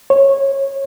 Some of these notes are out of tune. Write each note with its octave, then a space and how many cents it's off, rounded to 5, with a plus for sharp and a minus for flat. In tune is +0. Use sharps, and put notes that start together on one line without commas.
C#5 -20